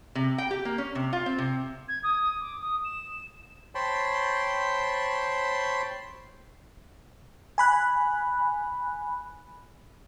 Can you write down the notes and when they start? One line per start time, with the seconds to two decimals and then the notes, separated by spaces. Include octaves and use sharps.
0.15 C3
0.38 G5
0.51 G4
0.65 A#3
0.78 C#4
0.95 C3
1.13 F4
1.26 C4
1.38 C3
1.88 G#6
2.03 D#6
2.41 D6
2.61 D#6
2.84 E7
3.75 C5 C#5 G5 A5 B5 C6
7.58 G#5 B5 F#6